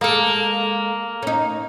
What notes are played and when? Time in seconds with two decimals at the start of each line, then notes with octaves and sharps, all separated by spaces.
0.01 G#3 A#3 A4
1.22 C#4 D#4